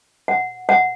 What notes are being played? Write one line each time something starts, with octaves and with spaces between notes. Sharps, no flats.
F#5
F#5